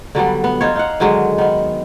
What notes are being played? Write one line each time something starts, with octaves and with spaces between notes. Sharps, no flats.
D3 F#3 G3 B3
B3
D#4 F4 C5 C#5
D#4 F5 F#5
D3 D#3 F#3 G#3
D#3 B3